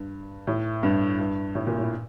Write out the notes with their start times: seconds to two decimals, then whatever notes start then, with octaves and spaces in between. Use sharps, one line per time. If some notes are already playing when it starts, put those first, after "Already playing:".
Already playing: G2
0.47 A2
0.83 G2
1.19 G2
1.55 A2
1.67 A#2
1.78 A2